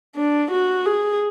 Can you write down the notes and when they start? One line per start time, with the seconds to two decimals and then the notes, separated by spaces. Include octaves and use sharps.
0.16 D4
0.52 F#4
0.86 G#4